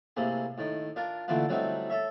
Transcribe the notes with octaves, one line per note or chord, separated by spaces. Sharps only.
A2 C3 A#3 G#4
A2 D#3
D4 F4 A#4
A#2 D3 E3 A3 E4 F4
F#3 G3 A3 C4 D#4 E4
A4 C#5 E5